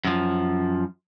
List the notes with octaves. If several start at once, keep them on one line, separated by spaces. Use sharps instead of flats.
F#2 F3